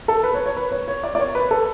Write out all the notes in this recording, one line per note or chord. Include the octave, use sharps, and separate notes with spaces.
A4
B4
C#5
C#5
B4
C#5
C#5
D5
D5
C#5
B4
A4